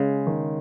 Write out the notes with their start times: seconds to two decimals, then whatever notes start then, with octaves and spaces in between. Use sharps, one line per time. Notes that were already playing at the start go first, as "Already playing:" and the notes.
Already playing: C#3 G#3
0.27 D#3